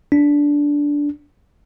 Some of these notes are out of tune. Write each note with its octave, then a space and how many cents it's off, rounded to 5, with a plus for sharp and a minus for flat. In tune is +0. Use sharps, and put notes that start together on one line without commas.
D4 -10